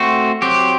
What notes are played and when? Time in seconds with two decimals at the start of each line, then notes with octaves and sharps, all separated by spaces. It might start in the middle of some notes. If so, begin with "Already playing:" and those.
Already playing: A3 C4 F#4
0.42 F#3 C4 G4